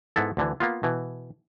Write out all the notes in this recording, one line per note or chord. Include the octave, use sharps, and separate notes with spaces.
G#2 B3 E4 A4
D2 D3 E3
A#3 B3 F4
B2 E3